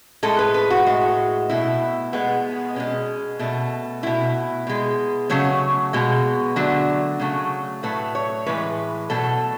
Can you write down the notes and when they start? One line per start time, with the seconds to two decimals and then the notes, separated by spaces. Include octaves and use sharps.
0.23 A2 G#3 A4
0.39 B4
0.54 B4
0.70 F#4
0.86 A2 G#3
1.49 B2 A3 E4
2.13 B2 G#3 B3
2.76 B2 G#3 C#4
3.39 B2 A3
4.03 B2 A3 E4
4.67 B2 G#3
5.30 C#3 F#3 A3 C#5
5.93 B2 G#3
6.56 D3 F#3 A3
7.20 C#3 F#3 A3
7.83 A2 F#3 A3 B4
8.15 C#5
8.46 A2 E3 G#3 B4
9.10 B2 F#3 A3 A4